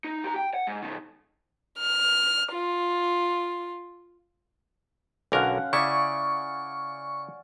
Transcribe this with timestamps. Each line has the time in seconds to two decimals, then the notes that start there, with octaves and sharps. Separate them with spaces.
0.04 D#4
0.24 G4 A#5
0.36 G5
0.54 F#5
0.67 G#2
0.82 B2 D#3
1.80 F6
2.54 F4
5.32 B1 D3 C#4 A#4 F5 F#5
5.73 C#3 E4 D5 G#5 C#6